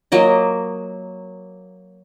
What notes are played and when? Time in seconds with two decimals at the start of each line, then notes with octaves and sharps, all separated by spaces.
0.12 F#3 A#3 D#5